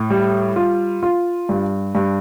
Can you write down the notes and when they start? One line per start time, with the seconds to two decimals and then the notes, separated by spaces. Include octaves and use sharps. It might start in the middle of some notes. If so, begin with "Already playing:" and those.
Already playing: A2
0.10 G3
0.56 F4
1.03 F4
1.49 G2
1.95 G2